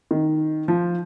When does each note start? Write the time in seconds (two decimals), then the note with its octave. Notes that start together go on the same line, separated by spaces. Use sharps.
0.11 D#3
0.68 F3